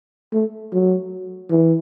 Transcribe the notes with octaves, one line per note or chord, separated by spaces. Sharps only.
A3
F#3
E3